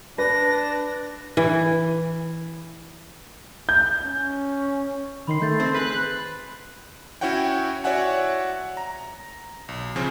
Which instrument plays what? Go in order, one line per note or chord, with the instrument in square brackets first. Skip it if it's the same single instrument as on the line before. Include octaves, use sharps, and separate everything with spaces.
[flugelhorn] D4 [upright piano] B4 [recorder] A#6
[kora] E3
[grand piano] G6
[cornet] C#4
[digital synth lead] D#3 [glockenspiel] B5 C6 C7
[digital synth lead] A3 [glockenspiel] G6 A6
[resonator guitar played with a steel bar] C4 C5
[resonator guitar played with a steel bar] G#4 B4 [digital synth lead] F#6
[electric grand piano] C#4 E4 F#4 C#5 F#5 G5
F#4 C#5 D5 E5 F#5 G#5
A#5
B1
C#3 F3 C4 C#4